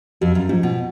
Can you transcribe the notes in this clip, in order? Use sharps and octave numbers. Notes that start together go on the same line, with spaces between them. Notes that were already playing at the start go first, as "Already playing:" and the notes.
F2 F#4
F#2
G#2 F3
B2